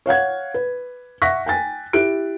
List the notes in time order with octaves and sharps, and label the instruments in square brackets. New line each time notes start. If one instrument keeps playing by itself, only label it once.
[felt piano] C#5 F5 F#5 G#6
B4
E5 F#5 C#6 F#6 A#6 B6
G5 G#5 A6
E4 G4 F#6 D7